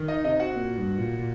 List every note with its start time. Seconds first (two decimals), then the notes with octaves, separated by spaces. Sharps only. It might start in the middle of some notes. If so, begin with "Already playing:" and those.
Already playing: D#3
0.08 D#4 D#5
0.24 C3 D#4 D#5
0.40 F#4 F#5
0.56 A#2
0.78 G2
0.98 A#2
1.19 A#2